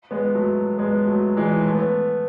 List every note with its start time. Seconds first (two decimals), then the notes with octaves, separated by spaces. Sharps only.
0.11 G#3 B3
0.34 F#3 A3
0.78 G#3 B3
1.07 F#3 A3
1.37 E3 G#3
1.66 A3
1.75 B3